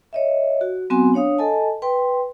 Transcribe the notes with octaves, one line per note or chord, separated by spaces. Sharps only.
C#5 D#5 E5
F#4
F#3 B3 C4 F#4 G#5 C6
D4 C#5 F5 D#6
A4 D#5 G#5 A5
B4 G5 C6